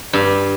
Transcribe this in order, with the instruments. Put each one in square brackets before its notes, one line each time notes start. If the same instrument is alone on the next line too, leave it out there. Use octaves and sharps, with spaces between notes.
[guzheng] G2